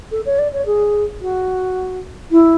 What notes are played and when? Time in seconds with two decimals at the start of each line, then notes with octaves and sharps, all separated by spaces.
0.11 A4
0.25 C#5
0.38 D5
0.53 C#5
0.66 G#4
1.21 F#4
2.31 E4